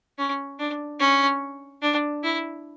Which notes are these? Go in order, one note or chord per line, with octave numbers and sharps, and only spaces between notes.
C#4
D4
C#4
D4
E4